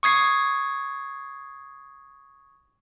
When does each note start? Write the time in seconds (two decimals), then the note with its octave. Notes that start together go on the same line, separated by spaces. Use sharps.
0.03 C#6 D#6 G#6 C7